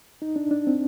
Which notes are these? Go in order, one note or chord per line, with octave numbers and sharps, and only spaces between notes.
D#4
D4
D4
C4